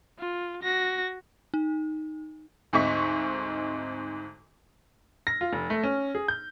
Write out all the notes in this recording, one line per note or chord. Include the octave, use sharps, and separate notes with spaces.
F4
F#4 A#6
D#4
D2 G#2 C4 D#4 C#6 B6
A#6
F4
F1
A3
C#4
G#4
G6